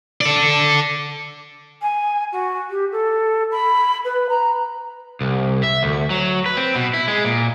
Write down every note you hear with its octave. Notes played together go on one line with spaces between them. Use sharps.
A4 D5
G#5
F#4
G4
A4
B5
B4
A#5
C2
E5
D2
F#3
B4
C4
B2
E4
G#3
A#2